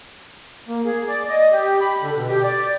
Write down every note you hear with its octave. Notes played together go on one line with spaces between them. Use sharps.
A#3
G#4
D5
D#5
G4
B5
D3
B2
G4
D5